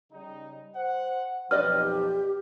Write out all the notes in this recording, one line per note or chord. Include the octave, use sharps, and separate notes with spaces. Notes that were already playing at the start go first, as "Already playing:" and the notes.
C#3 G3 D#4
C5 F#5
B1 F2 F3 G4 B4 D5 D#5 F6